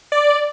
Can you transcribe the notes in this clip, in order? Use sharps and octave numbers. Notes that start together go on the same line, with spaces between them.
D5